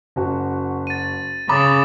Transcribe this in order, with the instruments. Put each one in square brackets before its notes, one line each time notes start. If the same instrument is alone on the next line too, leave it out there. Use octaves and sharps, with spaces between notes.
[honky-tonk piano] F#1 F#4
[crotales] A6 D#7
[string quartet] C#3 [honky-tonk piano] B5 [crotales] D6 D#6 A6